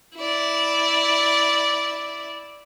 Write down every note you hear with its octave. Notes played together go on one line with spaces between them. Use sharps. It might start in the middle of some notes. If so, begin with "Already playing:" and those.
E4 D5